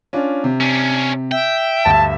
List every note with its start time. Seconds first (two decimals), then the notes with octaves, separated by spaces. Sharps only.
0.13 C#4 D4 F4
0.44 C3
0.60 C#4 D4
1.32 E5 G5
1.85 D2 G2 A5